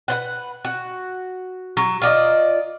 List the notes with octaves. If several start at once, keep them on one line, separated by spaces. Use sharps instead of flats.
B4 C5 F#5
F#4
F#3
F4 D5 D#5